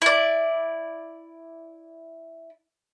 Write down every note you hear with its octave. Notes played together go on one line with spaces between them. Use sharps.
E4 D5